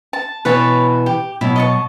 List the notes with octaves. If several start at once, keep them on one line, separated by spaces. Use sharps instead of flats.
A5
B2 E3 B4 C#5 A5
G4
B2 F#3 E4
D#5 A5 C#6